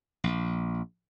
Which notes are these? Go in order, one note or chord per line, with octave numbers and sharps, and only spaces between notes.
A#1